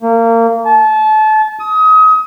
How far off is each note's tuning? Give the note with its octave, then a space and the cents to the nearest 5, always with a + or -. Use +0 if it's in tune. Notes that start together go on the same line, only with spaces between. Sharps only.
A#3 -25
A5 -30
D#6 +30